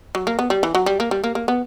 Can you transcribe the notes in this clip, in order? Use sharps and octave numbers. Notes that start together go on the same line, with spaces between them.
F#3
A#3
B3
G3
E3
F#3
G3
A#3
G3
A#3
A#3
B3